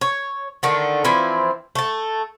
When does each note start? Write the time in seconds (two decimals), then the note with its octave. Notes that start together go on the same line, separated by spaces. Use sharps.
0.01 C#5
0.63 D3 D#3 A3
1.04 E3 F3 C4 E4
1.75 A3 A5